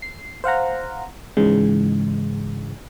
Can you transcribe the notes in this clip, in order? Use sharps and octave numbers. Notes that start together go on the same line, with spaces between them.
C7
C5 F5 F#5 A#5
G#2 C#3 E3 G#3